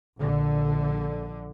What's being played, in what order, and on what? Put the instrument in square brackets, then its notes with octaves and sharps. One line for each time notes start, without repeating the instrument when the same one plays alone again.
[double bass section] A#1 D3